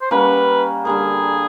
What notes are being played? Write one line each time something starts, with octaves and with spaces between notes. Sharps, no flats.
C5
G3 A#3 C#4 F#4 B4
D3 G3 A#3 G#4